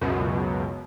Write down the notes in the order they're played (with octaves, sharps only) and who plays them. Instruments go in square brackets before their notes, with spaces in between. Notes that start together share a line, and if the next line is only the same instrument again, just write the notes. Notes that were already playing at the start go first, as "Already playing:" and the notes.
[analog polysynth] C#2 F#2 B2